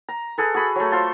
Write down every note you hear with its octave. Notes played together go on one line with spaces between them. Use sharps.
A#5
G#4 A4 B4
F#4 G#4 B5
F#3 A3
F4 A4 C5